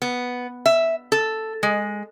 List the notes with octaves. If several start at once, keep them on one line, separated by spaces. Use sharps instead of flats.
B3
E5
A4
G#3